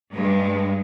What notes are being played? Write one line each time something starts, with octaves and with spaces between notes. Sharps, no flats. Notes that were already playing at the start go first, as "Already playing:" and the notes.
G2 G#3